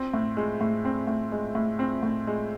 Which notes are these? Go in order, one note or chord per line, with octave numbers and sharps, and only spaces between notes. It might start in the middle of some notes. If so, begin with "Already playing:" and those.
Already playing: C4
A2
G#3
A2
C4
A2
G#3
A2
C4
A2
G#3